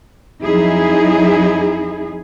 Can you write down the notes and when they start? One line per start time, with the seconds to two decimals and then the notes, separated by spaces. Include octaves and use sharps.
0.43 F2 F#3 D#4 E4 G#4